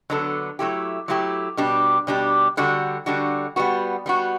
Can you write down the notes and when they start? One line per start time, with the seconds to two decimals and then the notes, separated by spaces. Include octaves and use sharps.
0.10 D3 F#3 B3 D4 A4
0.59 F#3 A3 E4 G4
1.08 F#3 A3 E4 G4
1.57 B2 G3 D4 G4
2.07 B2 G3 D4 G4
2.57 D3 G3 D4 F#4
3.06 D3 G3 D4 F#4
3.56 G3 B3 F#4
4.06 G3 B3 F#4